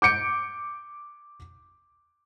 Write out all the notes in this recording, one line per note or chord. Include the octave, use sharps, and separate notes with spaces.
D6 G6 C#7 D7